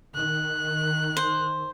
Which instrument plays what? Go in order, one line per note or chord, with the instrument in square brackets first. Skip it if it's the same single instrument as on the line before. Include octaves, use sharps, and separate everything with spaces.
[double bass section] D#3 [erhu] F#6
[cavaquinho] C5